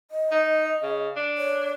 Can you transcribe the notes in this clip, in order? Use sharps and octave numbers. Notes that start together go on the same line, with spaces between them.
D#5
D#4
C#3
D4
C#5